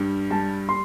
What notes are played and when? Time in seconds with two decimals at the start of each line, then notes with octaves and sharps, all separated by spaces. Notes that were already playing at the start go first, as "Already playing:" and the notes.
Already playing: G2 G3
0.30 G3 A5
0.69 C6